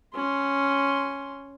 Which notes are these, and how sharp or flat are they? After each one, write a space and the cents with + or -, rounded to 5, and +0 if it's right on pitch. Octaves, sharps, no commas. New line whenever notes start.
C#4 +0 C6 +0